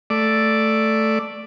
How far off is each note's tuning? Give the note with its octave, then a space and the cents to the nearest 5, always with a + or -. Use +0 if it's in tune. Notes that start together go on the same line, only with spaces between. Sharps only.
A3 +0 D5 +0